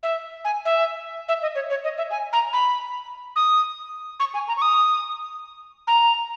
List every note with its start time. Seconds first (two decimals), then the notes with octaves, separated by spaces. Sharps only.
0.03 E5
0.45 G#5
0.65 E5
1.28 E5
1.42 D#5
1.55 C#5
1.70 C#5
1.84 D#5
1.98 E5
2.11 G#5
2.33 A#5
2.53 B5
3.36 D#6
4.20 C#6
4.34 G#5
4.48 A#5
4.57 C#6
4.62 D#6
5.87 A#5